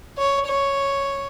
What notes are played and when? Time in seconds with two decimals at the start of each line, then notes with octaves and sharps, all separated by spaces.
0.18 C#5
0.47 C#5